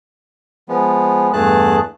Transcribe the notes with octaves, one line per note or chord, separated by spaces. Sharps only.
F3 G#3 B3
E2 G2 A3 G#4 A5 F#6